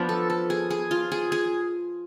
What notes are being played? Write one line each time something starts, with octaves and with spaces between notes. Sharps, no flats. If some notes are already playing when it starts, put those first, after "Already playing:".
Already playing: F3 B3 D4 F4
A4
A4
G#4
G#4
F4
G#4
G#4